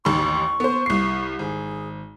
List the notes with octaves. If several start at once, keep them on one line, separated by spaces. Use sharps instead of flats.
A1 D#2 C6 C#6
B3 C5
C2 C7
G#1 G#4